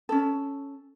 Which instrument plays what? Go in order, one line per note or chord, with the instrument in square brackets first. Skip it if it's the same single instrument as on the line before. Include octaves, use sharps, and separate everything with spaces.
[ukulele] C#4 A4